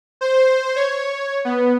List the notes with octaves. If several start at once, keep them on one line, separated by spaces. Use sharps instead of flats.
C5
C#5
B3